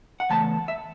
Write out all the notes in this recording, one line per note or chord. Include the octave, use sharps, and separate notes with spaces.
F#5
E2 C#3 A3 A5
E5